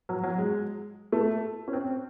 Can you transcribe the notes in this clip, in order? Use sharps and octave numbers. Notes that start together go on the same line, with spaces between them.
F#3
F#3
G#3
A3
C#4
C4